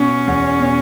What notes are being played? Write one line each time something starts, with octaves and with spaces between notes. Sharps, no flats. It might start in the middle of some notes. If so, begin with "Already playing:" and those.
Already playing: B2 C#4
E2
B2